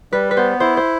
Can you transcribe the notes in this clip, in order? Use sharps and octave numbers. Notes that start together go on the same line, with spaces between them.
G3 B4
B4
B3 C5
E4 C5
C5